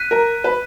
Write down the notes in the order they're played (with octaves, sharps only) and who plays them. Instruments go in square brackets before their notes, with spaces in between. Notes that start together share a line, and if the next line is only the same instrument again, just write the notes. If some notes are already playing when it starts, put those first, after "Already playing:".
Already playing: [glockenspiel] F#6 B6 D#7
[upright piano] A#4
B4